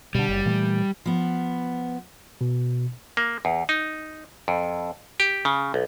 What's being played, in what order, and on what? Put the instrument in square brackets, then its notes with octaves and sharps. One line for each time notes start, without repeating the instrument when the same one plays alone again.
[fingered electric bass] B2 D3 [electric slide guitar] G3
[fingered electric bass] F#1
A#2 E3 A3
[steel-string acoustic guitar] F3 B3
[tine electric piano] B2
[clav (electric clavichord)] A#3
E2
D#4
F2
G4
C#3
B1